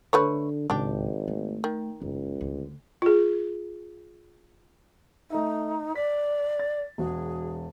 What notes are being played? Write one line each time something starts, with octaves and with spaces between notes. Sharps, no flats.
D3 A3 B4 C#5
G#1 C#2 A2 D4 G4
A3
D#3
F#1 C#2
D2
F4 G#4
A3 D#4 D#5 E5
D5 B6
A6
E1 F#4 G#4